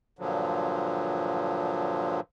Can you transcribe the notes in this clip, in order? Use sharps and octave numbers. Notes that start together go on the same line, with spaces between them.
G2 A#2 D3 F3 F#3